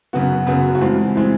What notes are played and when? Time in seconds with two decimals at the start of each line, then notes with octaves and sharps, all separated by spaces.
0.13 F#2 C#3 F#3 B3 F#4
0.47 F#2 C#3 F#3 B3
0.75 F#4
0.80 G2 E3 G#3 C4 F4
1.16 E3 G#3 C4